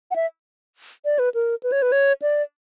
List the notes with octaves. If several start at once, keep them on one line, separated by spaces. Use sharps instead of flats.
F#5
E5
D5
B4
A#4
B4
C#5
B4
C#5
D5